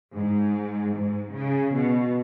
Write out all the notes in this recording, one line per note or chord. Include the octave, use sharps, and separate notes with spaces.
G#2
G#2
C#3
B2